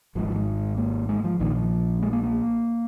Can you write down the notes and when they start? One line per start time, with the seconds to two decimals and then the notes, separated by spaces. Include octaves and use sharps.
0.15 G#1 F3
0.18 G#2
0.26 F3
0.35 G#3
0.77 A#3
1.09 G#3
1.24 F3
1.40 A#1 A#2 D#3
1.56 F3
2.02 G#3
2.13 A#3
2.23 A#3